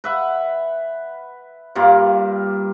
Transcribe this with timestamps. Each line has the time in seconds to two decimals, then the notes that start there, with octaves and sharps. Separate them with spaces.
0.04 B4 E5 F#5
1.75 G2 G3 A#3 F4